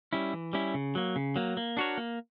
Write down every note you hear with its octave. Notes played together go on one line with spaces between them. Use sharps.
G3 C#4 E4
E3
G3 C#4 E4
C#3
F#3 A#3
C#3
F#3 A#3
A#3
D4 F#4 A#4 C#5
A#3